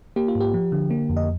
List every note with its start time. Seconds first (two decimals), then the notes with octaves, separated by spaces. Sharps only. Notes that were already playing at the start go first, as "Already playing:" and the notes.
0.16 A#3 G4
0.28 F4
0.35 G#2
0.40 G4
0.54 F3
0.72 D3
0.90 A#3
1.10 F2
1.17 D#5